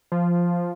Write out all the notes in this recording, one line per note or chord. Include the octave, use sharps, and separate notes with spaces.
F3